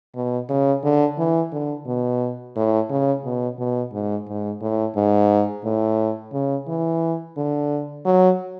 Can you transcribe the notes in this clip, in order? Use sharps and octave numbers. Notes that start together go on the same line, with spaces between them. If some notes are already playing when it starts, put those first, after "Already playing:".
B2
C#3
D3
E3
D3
B2
A2
C#3
B2
B2
G#2
G#2
A2
G#2
A2
C#3
E3
D3
F#3